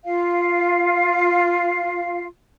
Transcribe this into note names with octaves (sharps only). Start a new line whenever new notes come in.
F4 F5